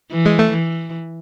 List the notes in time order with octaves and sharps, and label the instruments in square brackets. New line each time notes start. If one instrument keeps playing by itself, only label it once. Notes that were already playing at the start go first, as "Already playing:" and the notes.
[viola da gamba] E3
[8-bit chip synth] G#3
A3
[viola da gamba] E3